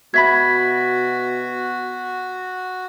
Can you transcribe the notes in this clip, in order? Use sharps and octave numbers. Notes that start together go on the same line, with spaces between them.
B2 F#4 E5 B5 G#6 B6